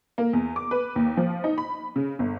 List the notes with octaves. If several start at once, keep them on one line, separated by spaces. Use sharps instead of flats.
A#3
E2
D6
B4
D#2
F3
D#4
B5
C#3
G1